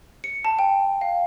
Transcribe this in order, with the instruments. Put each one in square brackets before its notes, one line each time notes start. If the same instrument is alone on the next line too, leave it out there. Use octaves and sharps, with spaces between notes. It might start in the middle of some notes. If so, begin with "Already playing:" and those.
[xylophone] C#7
A5
G5
F5